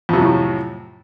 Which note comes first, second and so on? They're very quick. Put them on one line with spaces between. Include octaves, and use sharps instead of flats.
F2 C3 F#3 A2